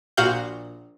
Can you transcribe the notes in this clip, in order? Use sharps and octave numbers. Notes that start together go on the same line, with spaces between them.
A#1 A#2 F#4 F5 F#5 G6